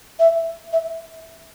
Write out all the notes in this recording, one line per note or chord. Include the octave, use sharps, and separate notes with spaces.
E5
E5